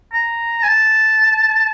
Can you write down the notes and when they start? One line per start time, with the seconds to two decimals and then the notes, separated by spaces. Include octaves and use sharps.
0.13 A#5
0.63 G#5
0.68 A5